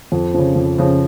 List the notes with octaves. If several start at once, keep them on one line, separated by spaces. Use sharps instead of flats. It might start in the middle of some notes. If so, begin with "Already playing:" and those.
F2
C#3 F3
F2
C#3 F3